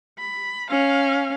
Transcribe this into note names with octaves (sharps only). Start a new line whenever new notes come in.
B5
C#4 F5